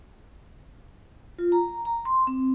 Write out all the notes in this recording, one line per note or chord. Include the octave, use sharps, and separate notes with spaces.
F4
A#5
A#5
C6
C4